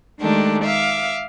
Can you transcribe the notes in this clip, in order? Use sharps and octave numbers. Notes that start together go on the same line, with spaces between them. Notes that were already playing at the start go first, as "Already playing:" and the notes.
D#3 G#3 A3 D4 G4
E5 F5 D6